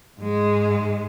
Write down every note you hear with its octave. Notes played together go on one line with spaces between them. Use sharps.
G#2 G#3